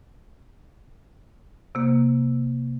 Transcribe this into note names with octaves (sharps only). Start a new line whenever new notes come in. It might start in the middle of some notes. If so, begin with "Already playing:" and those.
C3 A#3